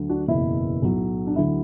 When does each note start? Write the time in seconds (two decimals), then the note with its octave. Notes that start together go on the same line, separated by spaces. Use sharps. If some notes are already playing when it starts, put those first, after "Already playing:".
Already playing: D2 D3 F#3
0.09 D4 F#4
0.28 F#1 E2 B2 E4
0.83 B1 A2 F#3
1.27 D4
1.36 D2 D3 F#3 E4